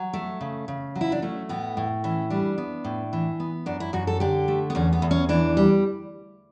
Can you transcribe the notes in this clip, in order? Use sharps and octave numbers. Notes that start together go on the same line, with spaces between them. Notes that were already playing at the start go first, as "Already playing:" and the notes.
Already playing: F#3
A3
C#3
C#3
F#3
E4
D4
A3 C#4
A2 B3
A2
E3 C#4
G3 D4
B3
A2
E3
B3
F#2 D4
E4
F#2 F#4
A4
D3 G4
A3
B3
E2 C#4
B3
E2
C#4
E3 D4
G3